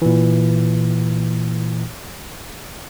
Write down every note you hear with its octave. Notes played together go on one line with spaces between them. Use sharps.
A#2 E3